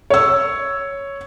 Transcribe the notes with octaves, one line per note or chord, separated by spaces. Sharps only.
C#5 E6